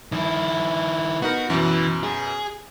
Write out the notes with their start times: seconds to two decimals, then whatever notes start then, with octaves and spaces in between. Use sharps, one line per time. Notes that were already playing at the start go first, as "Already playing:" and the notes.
0.12 G1 D#3 E4
1.22 B3 D#4 F#4 A#4
1.50 F#2 B2 E3
2.04 G#4